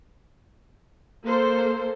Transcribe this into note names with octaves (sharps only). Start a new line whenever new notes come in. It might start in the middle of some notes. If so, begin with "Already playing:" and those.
A#3 A4 C5